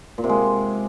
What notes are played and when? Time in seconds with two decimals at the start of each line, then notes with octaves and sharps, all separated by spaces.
0.18 A#2
0.24 C3
0.29 G#3